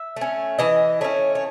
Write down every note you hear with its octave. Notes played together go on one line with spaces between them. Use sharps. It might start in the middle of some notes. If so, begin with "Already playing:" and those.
Already playing: E5
A3 C#4
E3 D#5
A3 C#4 C#5
C#5